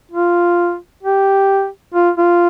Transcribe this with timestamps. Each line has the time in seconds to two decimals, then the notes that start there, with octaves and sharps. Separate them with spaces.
0.12 F4
1.03 G4
1.94 F4
2.18 F4